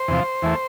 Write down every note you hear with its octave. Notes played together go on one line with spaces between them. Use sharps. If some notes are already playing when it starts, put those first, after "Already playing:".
Already playing: C5
E2 C3 F3
E2 E3 A3